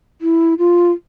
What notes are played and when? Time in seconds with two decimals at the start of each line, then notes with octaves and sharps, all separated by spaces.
0.21 E4
0.59 F4